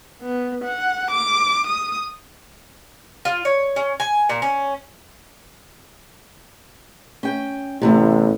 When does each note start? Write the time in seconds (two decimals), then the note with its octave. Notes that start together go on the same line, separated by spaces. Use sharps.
0.22 B3
0.64 F#5
1.11 D6
1.67 D#6
3.25 F4
3.45 C#5
3.76 C#4
4.00 G#5
4.29 A#2
4.42 C#4
7.23 C#4 G5
7.82 A1 E2 A2 C3